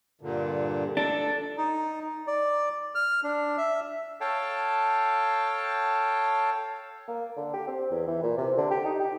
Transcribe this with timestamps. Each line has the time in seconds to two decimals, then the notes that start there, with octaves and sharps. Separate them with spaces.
0.21 G2 A#2 D3
0.97 D4 A4
1.58 D#4
2.27 D5
2.95 F6
3.23 D4
3.57 E5
4.21 A4 C#5 F5 G5 A5
7.08 A#3
7.37 D3
7.53 G4
7.67 C4
7.91 E2
8.08 E3
8.23 A#2
8.38 C3
8.58 D3
8.70 G4
8.85 D#4
9.00 G4